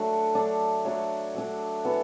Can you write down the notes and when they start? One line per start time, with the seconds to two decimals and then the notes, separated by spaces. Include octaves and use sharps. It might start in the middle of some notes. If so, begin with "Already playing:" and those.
Already playing: F#3 A3 D4 F#4
0.34 F#3 A3 D4 F#4
0.85 F#3 A3 D4 F#4
1.35 F#3 A3 D4 F#4
1.85 E3 B3 F#4 A4